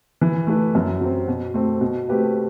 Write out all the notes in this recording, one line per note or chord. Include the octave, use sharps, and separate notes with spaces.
E3
A3 E4 B4
F#2
F#3 C4
B2
A3 C4
B2
A3 C4 G4 B4